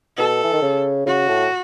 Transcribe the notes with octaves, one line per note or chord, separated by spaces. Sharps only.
B2 A4
E3
D#3
C#3
C#3 F#4
A2